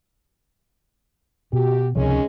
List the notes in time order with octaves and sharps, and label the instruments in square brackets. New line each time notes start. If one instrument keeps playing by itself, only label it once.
[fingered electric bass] B2 [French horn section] F#4 G4
[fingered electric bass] C#2 C3 F3 [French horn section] D#3 G#3 C#4